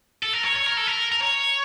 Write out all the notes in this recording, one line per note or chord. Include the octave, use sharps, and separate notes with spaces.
A4
A#4
C#5
C#5
A#4
A4
A#4
A#4
C#5